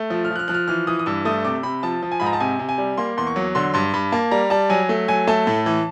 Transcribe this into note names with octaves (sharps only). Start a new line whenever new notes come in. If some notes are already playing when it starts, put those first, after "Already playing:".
Already playing: A3
F3
F6
F3
F#6
F6
F3 F#6
F6
E3 F6
E3 D#6
D#6
G2 E6
A3 D#6
C3 D6
C3 B5
F3 A5
F3
G#5
G#2 B5
A#5
A5
C3 G#5
C3
G#5
G3
A#3 C6
E2 C6
C#6
F#3
D3 C6
G2 C6
G2 B5
A#3 A5
G3 A#5
G3 A5
F#3 G#5
A3
F#3 G#5
A3 A5
A2
E3